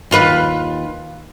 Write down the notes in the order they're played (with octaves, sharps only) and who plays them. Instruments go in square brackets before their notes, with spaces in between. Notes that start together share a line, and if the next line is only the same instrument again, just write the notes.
[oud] D#2 F4 B4